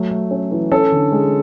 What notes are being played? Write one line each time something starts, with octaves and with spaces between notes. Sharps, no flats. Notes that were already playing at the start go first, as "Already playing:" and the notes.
Already playing: F#3 A3
A3
C#4
E3
C#4 A4
D3
G#3